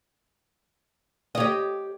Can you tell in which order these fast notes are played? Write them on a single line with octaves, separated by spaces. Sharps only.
D#5 C#5 G4